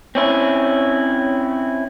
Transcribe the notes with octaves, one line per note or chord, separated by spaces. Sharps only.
C4 C#4 E4